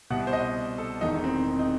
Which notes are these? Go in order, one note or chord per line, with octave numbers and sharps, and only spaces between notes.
C2 B2 F#5
C5
D#5
A4
E1 E2 D#3 D#4
D#4
C4
D#4